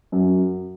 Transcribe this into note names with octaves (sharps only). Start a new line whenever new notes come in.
F#2